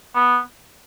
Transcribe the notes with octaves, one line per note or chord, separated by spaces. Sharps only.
B3